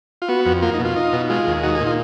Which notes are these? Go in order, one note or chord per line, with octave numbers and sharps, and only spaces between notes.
F4
B3 F#4
F2
A#3 F4
D#4
B2
F4
D#4
B2
G#3 F4
D#2
D#4 F#4
G#4
A#2
F4